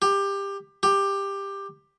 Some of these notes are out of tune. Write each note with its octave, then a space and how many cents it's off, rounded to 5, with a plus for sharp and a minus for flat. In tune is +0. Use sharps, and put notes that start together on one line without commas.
G4 +20
G4 +15